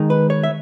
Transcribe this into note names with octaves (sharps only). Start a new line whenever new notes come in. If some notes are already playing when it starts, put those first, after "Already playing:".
Already playing: D#3 G#3 D#4
B4
C#5
E5